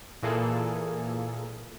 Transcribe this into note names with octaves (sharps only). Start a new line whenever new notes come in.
A#2 E3 A#3 G#4 A4